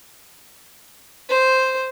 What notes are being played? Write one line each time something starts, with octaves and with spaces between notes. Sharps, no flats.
C5